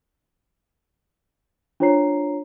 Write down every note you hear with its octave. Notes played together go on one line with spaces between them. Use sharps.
D4 F4 C5 C#5 A#5 C7